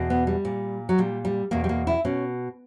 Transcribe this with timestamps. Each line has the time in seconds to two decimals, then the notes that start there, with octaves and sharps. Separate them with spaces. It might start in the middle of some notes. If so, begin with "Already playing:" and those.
Already playing: E2 B2
0.10 B3
0.27 G3
0.45 A#2
0.89 F#3
0.98 A#2 G3
1.25 G3
1.51 E2 B2 A#3
1.64 G3
1.69 A#3
1.87 E4
2.05 B2 C#4